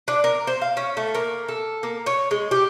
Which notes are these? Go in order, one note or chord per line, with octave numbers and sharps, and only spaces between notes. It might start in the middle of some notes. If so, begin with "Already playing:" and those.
D4
A#4
C5
F5
C#4
A3
A#3
A4
A#3
C#5
G#3
G4